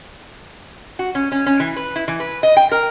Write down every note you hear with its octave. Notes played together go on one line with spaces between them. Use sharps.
F#4
C#4
C#4
C#4
E3
B4
E4
E3
B4
D#5
G5
A#4